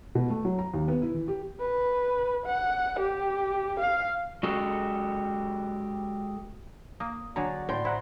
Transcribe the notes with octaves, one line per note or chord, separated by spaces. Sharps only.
B2
A3
F#3
A#5
D#2
B3
E4
E3
G4
B4
F#5
G4
F5
G#3 F#4 G4 A4
A#3 D#6
D3 F#3 F#4 G#4 D5 A#5
A2 G5 C6
E4 C5 F#5 A#5